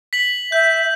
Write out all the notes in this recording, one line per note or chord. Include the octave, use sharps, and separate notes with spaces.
B6 F#7
E5 G6